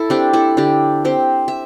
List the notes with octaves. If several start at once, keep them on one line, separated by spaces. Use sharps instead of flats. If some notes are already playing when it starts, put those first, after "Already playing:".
Already playing: E4 A4
C4 D4 G4
E4 A4
D3 D4 G4
C4 G4 C5
E5